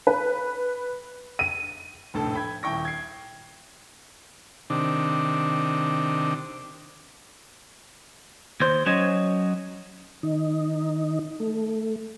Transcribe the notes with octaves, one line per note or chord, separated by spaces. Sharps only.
B4
D#7
F1 A#1 A2 A4 A5
G5 B5 G#6
D#1 E4 G5 C#6 A#6
G#6 C7
C3 D#3 D4
D#2 C5
F#3 C#4 C#5 D#5
D#3 D#4
A3